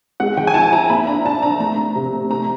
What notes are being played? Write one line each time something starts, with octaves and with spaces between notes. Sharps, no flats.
G#3 F#5
D#3 G5
G#5
E4 A5
E4 A#5
A#3 B5
D4 A#5
D4 A5
D4 A#5
A3 A#5
A3
C3
A3
A3 A#5